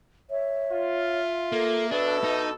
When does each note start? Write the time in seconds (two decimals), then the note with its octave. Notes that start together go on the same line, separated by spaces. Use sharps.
0.30 C#5 E5
0.71 F4
1.52 A#3 A4
1.91 B2 D4 A4 B4
2.24 D#4